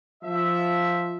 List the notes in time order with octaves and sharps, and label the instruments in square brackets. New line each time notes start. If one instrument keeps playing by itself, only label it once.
[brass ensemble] F3 E5